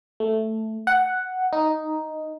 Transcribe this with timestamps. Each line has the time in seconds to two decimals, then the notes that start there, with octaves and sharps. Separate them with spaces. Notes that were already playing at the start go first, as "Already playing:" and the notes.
0.20 A3
0.87 F#5
1.53 D#4